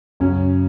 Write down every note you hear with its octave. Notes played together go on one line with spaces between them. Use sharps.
F#2 C#3 C#4